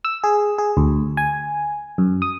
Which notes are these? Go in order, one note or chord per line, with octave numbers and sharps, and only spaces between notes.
E6
G#4
G#4
D2
G#5
F#2
D#6